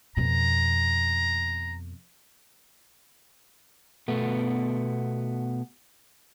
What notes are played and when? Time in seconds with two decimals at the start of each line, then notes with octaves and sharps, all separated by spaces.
0.17 F2 B2 A#5
4.08 B2 A3 B3